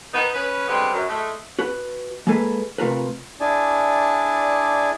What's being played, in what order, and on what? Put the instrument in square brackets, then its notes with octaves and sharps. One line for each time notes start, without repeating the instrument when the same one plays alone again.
[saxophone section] B3 D#4
C#4 B4
D3 G3 G#3 B3 C4
F#2
A2 G#3 A3
[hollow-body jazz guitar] F#4 B4
G#3 A#3 G#4 A4 B4
C3 A3 F4 A#4 B4
[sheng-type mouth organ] D4 E4 G#4 D5 G#5 A5